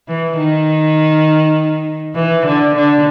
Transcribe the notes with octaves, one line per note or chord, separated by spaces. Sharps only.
E3
D#3
E3
D3
D3